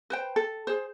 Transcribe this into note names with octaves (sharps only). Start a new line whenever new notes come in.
B4 C5 G5
A4
G#4 C5